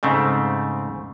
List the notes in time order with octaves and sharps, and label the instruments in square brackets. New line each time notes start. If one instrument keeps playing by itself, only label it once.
[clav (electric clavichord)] G#2 C#3 A3 C4